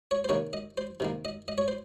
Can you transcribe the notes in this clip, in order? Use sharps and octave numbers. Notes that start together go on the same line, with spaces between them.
C#5
C5
C3 D#3 A#3 C#5
D#5
C5
C3 D#3 A#3
D#5
D#5
C#5
C5